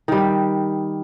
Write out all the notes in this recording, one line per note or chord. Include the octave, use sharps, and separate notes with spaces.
D#3 G3